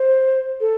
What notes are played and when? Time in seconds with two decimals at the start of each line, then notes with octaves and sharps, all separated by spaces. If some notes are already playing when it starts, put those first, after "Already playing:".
Already playing: C5
0.61 A4